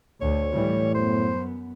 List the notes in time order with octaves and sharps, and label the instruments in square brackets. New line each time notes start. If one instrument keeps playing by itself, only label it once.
[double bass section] D2 [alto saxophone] C#5
[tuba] A2 [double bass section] E3 G3
[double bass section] F#2 B3 [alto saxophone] C5